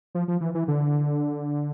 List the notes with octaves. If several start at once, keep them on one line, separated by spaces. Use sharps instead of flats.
F3
F3
E3
E3
D3